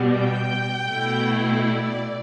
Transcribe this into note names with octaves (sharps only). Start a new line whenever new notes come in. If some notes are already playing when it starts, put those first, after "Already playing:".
Already playing: B2 G3 B3
G5
B2 A3 E4
D5